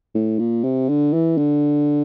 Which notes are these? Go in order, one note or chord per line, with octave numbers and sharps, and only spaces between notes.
A2
A#2
C3
D3
E3
D3